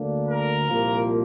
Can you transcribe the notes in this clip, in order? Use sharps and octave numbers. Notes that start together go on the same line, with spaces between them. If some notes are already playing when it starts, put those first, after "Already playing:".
Already playing: D2 D3 A#3 D4
A#4
C2 A#2 F3 A#3